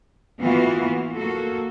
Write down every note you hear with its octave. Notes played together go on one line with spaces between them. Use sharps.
E3 A#3 B3 F4 F#4
A#3 F#4 A4